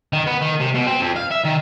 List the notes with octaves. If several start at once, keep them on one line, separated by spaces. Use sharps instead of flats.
D#3
B3
D#3
C3
B2
C4
F2
F5
E5
D#3